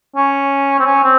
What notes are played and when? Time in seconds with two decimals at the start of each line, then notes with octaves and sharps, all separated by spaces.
0.16 C#4
0.79 C4
0.86 C#4
1.03 C4